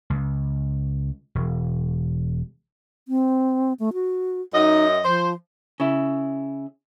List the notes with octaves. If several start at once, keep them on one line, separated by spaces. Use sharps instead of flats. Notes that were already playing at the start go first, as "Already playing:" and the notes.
C#2
E1
C4
A3
F#4
F#2 D#4 D#5
F3 C5
C#3 E4